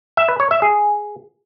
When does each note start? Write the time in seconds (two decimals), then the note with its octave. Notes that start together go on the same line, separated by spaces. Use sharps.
0.17 E5
0.28 B4
0.40 C#5
0.51 E5
0.62 G#4